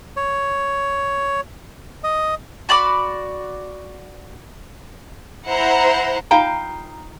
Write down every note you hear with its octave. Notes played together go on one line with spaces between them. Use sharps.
C#5
D#5
F#4 D5 B5 D6
E4 C5 F#5 A#5
D#4 F4 F5 G5 A#5